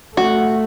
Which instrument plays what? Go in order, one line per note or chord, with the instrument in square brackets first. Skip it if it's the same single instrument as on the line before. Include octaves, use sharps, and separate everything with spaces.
[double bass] A3 [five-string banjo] F#4